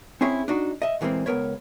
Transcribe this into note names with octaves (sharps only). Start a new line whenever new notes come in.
C4 C#4 E4 G#4 C#5
D4 D#4 F#4
D#5 E5
A#2 E3 G#3 A#3 C4
C#2 D#3 B3 A#4 B4 C#5